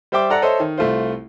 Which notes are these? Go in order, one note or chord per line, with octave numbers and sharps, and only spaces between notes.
G3 C5 E5 G5 D6
A4 D5 F#5 A#5 F#6
A4 C5 C#5 D#5 E5
D#3
C2 A3 F4 C5